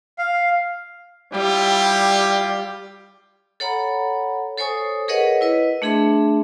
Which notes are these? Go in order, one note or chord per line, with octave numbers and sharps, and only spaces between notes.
F5
G3 E4 F4 G4
A4 C#5 F#5 A#5 B5
A4 C5 C#5 G#5 C#6 D#6
G#4 A#4 B4 C#5 D#5 F#5
E4 B4 D#5
A3 D4 G#4 E5 C6